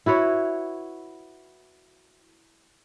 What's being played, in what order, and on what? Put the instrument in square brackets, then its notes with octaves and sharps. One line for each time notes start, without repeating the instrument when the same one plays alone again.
[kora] E4 F#4 B4 C#5